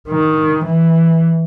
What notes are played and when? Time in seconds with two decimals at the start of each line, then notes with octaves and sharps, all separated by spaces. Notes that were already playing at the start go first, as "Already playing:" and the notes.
0.09 D#3
0.65 E3